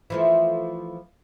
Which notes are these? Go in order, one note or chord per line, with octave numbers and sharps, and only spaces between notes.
E3 F3 A3